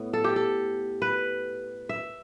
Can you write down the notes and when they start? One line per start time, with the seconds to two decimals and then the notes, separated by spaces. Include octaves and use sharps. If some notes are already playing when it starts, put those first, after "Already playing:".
Already playing: A2 B3
0.13 A4
0.24 G4
0.36 A4
1.02 B4
1.89 E5